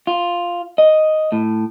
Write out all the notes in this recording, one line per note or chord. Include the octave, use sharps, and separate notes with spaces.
F4
D#5
A2